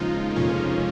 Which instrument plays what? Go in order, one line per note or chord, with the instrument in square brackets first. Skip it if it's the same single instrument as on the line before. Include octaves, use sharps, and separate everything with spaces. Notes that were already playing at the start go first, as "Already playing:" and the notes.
Already playing: [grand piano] D#2 C#3 [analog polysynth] F3 G#3 D#4 F4
[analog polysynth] A#3
[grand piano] F1 [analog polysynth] C#4